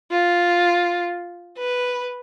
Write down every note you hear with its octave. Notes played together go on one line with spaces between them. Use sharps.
F4
B4